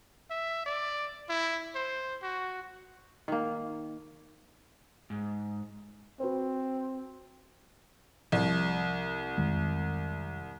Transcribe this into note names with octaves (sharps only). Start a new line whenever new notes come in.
E5
D5
E4
C5
F#4
D#3 A#3
G#2
C4 F#4 B4 C5
C2 F3
F2 D#3 G#3